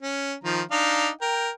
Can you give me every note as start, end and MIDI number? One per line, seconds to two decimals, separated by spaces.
0.02 0.34 61
0.44 0.61 51
0.44 0.61 53
0.44 0.61 82
0.71 1.09 62
0.71 1.09 63
0.71 1.09 77
1.21 1.50 70
1.21 1.50 79